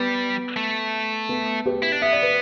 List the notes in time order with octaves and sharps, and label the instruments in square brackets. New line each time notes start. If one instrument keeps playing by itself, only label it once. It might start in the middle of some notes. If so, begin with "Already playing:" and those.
Already playing: [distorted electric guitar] G3 [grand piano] B3
[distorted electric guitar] A3
[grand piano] B3
G4 B4
[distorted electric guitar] E4
D4
[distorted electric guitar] B3 [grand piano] E5
[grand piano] D5
B4